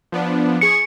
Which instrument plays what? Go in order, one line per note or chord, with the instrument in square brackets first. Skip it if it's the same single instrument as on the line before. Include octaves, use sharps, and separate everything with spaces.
[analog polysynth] F3 B3 D4
[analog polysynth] G#4 C#6 [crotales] C#7